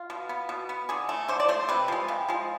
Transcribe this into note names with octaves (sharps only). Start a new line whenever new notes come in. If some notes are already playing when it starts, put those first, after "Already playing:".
Already playing: F4
B2
B3
B2
B3
D3 G#4
A3
D3 C5
D5
A3 C5
C3 B4
F3 G#3
C3
F3 G#3